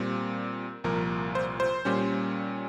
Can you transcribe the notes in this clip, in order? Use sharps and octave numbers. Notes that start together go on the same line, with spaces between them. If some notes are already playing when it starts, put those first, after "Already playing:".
Already playing: A#2 G3 C4
C2 A#2 F3 A#4
C5
C5
A#2 G3 C#4